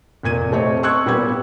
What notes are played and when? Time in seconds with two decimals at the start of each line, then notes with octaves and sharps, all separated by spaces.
0.23 F1 A#2 G#6 D#7
0.52 A3 C4 C#5 D#5
0.83 C6 C#6 E6 F#6 G#6 C#7
1.05 A#2 G3 B3 G4 G#6